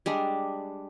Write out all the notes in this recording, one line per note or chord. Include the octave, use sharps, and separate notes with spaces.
G3 G#3 D4